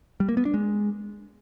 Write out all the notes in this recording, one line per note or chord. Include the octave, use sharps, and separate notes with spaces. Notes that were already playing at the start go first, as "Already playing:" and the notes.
G3
A#3
B3
D4
G#3